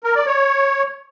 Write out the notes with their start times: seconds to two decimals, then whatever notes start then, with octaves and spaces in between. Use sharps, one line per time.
0.04 A#4
0.15 D5
0.26 C#5